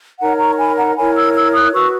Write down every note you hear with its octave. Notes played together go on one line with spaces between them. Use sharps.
D#4 A#4 C#5 F#5 A#5
A#5 C#6
G#5 B5
F#5 A#5
E4 A#4 C#5 G#5 B5
E6 G#6
E6 G#6
D#6 F#6
F#4 B4 C#6 E6